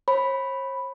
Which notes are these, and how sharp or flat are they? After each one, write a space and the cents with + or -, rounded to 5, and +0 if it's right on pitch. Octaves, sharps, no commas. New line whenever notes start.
C#5 -45 B5 +0